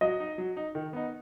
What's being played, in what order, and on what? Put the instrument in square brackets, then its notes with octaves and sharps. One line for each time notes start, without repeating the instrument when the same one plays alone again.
[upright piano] F#3 [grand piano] D#5
[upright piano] D#4
F#3
D#4
D#3
B3 D#4